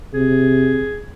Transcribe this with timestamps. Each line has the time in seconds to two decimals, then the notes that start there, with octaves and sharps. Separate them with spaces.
0.14 C3 G#4